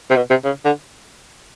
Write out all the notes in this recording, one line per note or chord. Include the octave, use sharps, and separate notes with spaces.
C3
B2
C3
C#3
D3